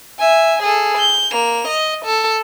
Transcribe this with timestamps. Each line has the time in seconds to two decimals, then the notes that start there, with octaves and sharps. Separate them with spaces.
0.19 E5 G#5
0.63 G#4 A4
0.97 G6
1.32 A#3 F7
1.68 D#5
2.05 A4